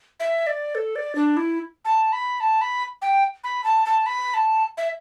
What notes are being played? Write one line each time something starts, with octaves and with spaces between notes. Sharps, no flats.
E5
D5
A4
D5
D4
E4
A5
B5
A5
B5
G5
B5
A5
A5
B5
A5
E5